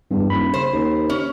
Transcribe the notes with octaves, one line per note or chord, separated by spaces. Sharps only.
E2 G2
D#1 B5
C#3 C5
D#2
C#4